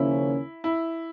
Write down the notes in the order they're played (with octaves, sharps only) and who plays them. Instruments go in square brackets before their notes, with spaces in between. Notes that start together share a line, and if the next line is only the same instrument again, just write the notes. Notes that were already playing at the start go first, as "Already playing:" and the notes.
Already playing: [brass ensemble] D#2 C#3 F3 A#3 C#4 [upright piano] E4
[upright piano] E4